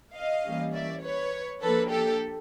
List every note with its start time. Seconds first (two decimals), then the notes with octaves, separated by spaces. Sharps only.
0.15 D#5 F5
0.44 E3 G3 A#3 C#4
0.73 D5 E5
1.02 B4 C#5
1.61 F3 A#3 D4 A4 B4
1.90 G4 A4